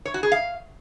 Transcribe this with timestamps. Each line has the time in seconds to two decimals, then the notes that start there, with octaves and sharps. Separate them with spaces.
0.05 C#5
0.14 F#4
0.23 G#4
0.32 F5